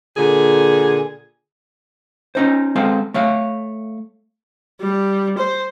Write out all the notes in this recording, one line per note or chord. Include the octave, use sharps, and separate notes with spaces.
A#2 D3 G#4
C#4 D#4 C5
G#3 C4 A4 F5
A3 C#5 F5
G3
C5